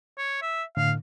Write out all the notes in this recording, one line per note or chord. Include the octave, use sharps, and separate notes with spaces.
C#5
E5
A2 D3 F5